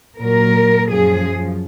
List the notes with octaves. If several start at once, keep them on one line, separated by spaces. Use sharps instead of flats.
A#2 F#3 A#4
F#2 F3 G#4